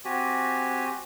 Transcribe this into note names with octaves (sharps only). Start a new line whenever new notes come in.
C4 F#4 G4 G#5